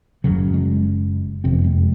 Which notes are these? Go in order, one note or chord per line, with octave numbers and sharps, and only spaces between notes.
F#1 F#2 C#3 F#3
G#3
F#1 F2 C3 C4
G#3